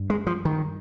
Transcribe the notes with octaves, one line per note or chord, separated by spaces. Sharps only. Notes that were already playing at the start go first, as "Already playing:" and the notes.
Already playing: G2
G#3
F3
D#3